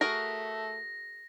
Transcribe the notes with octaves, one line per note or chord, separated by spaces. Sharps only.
A3 F#4 G#4 A#4 A#6